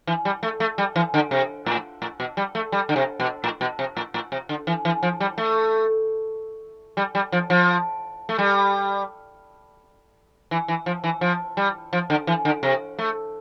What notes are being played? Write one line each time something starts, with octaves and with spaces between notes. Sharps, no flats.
E3
G3
A3
A3
G3
E3
D3
C3
A2
A2
B2
G3
A3
G3
D3
C3
B2
A2
B2
C3
A2
A2
C3
D3
E3
E3
F3
G3
A3
G3
G3
F3
F3
A3
G3
E3
E3
F3
E3
F3
G3
F3
D3
E3
D3
C3
A3